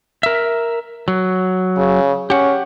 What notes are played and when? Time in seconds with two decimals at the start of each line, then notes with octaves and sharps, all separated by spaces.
0.23 A#4 E5
1.08 F#3
1.77 C#3
2.30 C#4 G4 F#5